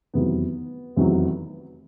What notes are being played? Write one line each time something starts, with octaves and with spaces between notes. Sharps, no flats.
F1 E2 C3 D#3 F#3 B3
F1 E2 C3 D#3 F#3